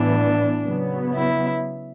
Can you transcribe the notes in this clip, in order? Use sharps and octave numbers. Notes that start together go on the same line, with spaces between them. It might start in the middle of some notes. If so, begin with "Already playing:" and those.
Already playing: A2 E3 B3 D4
C#3 F#3 B3
E4